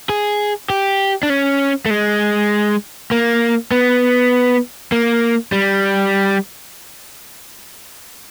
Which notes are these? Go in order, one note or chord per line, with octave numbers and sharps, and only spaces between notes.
G#4
G4
D4
C#4
A3
G#3
A#3
B3
A#3
G3